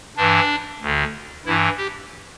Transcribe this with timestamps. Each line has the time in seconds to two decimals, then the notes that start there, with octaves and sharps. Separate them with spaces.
0.17 G2 E3 D4
0.82 D2 D3
1.46 G2 E3 E4
1.78 G4